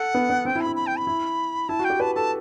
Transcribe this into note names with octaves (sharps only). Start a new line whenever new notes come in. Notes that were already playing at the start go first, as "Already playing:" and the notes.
Already playing: A4 F#5
B3
B3
C4 G5
E4
B5
E4
B5
G5
B5
E4
E4 A5
F#4
G5
G4
B4 A5
A4 A5